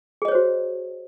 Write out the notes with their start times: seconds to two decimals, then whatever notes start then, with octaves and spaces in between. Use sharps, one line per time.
0.22 G#4
0.25 D#5
0.28 C#5
0.32 C5
0.35 F#4